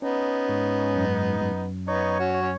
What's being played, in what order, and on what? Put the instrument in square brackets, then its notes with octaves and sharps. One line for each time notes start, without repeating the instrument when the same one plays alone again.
[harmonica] B3 D#4 [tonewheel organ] C#4
[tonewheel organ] G#2
F#2
F#2
[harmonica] B3 D#4 [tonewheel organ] C#5
[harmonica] C#4 F#4
[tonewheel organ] C#5
[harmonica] C#4